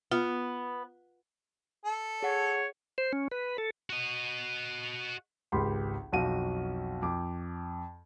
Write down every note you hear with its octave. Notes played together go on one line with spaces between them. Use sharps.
B3 F4
A4
G#4 C#5 F#5
C5
C#4
B4
A4
F#4 D#5
G#1 C#2 G4 B5 C6
B1 F2 F#4 F5 D#7
F2 D6